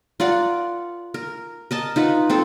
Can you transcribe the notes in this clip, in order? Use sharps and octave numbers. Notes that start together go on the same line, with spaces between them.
F4 A#4 D5 F#5
A#4
A#4 D#5 A5
D#4 F4 B4 F#5
C4 F4 A4